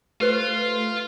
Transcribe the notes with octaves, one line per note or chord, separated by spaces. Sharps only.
A3 F4 G4 B4 C5